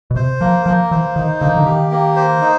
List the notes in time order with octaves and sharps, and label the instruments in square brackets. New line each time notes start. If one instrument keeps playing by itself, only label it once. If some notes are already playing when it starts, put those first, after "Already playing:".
[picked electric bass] B2
[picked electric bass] C3 [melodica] C5
[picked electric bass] F3 [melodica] A#3
[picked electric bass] F3 [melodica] A#3
[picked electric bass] E3 [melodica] C5
[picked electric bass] D#3 [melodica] D#4
[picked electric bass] D3 [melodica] A#3
[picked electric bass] D#3
D3
[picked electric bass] D#3 [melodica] G4
[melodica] A#3
C5
D#4